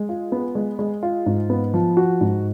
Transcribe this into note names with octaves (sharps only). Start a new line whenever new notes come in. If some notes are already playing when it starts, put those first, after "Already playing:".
Already playing: G#3
F4
B3
G#3
G#3
F4
G#2
B3
F3
F#4
G#2